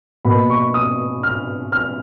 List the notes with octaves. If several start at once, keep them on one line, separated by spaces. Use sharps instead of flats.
B2 A#3 B5
C#6
D#6
F6
F6